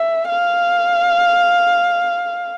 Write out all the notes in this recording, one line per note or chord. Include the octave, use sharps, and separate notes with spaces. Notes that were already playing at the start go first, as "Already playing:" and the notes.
Already playing: E5
F5